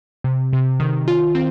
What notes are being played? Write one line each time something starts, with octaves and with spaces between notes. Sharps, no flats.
C3
C3
D#3
F4
C4